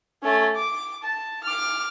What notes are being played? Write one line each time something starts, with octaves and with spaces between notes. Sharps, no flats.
A3 C#4
D6
A5
D6 F6